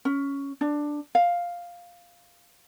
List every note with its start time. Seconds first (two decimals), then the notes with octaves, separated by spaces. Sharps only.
0.05 C#4
0.61 D4
1.15 F5